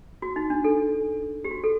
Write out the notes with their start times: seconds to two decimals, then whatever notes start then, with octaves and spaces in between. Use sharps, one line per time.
0.22 F#4
0.36 D#4
0.50 D4
0.64 A4
1.44 G4
1.51 F#4
1.64 A4